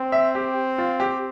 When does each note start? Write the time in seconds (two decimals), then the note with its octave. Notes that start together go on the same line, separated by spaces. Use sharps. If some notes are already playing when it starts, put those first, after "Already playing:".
Already playing: C4
0.12 E5
0.35 G4
0.78 F4
1.00 G4